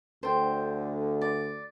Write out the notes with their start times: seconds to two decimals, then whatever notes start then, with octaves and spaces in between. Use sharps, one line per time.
0.23 D2 D3 C5 G5
1.21 D5